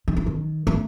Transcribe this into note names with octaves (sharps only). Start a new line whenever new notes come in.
D#3
E3
D#3
A3